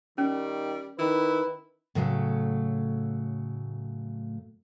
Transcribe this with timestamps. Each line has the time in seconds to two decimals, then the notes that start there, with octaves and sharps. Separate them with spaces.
0.18 D#3 G3 C#4
0.99 D#3 E4 B4
1.95 A2 C#3 F#3 A3